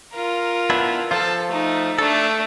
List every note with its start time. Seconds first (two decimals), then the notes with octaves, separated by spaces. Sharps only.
0.14 F4 A#4
0.70 B3 D4 E4
1.11 F3 F4 A4
1.49 A3 D#4
1.99 A3 D4 A4